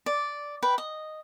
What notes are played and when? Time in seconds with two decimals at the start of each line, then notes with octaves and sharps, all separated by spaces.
0.06 D5
0.62 B4 G5
0.78 D#5